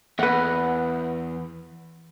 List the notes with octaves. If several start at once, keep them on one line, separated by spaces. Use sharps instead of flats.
E2 B4 F#5